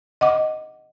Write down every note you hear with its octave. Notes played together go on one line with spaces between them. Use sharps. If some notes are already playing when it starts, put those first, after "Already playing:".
D#5 F#5 D6